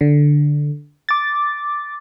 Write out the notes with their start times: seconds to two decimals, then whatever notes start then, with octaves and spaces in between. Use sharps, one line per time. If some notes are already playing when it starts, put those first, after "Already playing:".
0.01 D3
1.09 D6 A6